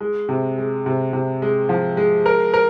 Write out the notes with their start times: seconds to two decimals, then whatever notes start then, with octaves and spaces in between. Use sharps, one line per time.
0.01 G#3
0.29 C3
0.58 G#3
0.86 C3
1.13 C3
1.42 G#3
1.69 F3
1.97 G#3
2.26 A#4
2.54 A#4